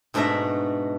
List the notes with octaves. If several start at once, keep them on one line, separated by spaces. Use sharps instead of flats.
G#2 B2 A3 D4 E5 A#5